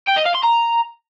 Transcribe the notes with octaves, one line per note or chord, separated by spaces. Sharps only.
G5
D#5
F5
C6
A#5